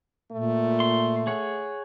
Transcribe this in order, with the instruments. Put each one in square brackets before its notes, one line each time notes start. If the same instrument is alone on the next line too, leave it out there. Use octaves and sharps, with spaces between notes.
[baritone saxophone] A#2 [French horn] A3
[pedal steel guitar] C6
G#4 C#5 F#5